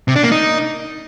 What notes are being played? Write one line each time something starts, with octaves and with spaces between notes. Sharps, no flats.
C3
D4
A#3
D#4